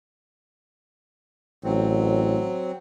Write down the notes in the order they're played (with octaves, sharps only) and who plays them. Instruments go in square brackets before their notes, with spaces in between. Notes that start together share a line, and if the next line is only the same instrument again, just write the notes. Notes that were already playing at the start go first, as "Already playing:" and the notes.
[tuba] A1 [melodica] F#3 C4